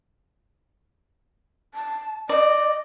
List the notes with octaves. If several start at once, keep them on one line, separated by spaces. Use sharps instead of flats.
A5
D5 D#5